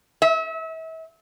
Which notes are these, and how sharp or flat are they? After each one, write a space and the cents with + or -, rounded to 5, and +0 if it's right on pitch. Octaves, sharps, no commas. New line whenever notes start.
E5 -35